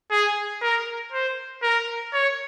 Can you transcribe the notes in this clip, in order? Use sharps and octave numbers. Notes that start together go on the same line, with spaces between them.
G#4
A#4
C5
A#4
C#5